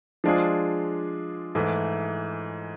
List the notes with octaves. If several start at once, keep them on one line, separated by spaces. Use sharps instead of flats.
F3 G#3 D4 F4 G#4
G#2 E3 A3 E4